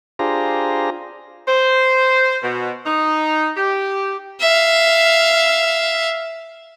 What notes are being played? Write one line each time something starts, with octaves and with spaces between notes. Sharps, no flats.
D4 F4 G4 G#4 C5 A#5
C5
B2
D#4
G4
E5 F5